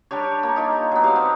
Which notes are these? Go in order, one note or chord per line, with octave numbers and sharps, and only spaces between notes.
G3 D4 G4 C#5
A#3
D#4 F4
F#3 B3
G3 F5
C4